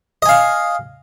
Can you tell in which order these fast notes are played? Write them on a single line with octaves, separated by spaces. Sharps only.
D#5 G#5 F5